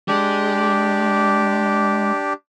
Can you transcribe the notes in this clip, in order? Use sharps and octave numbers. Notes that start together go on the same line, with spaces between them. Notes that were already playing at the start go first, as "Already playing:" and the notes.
G#3 D4 G4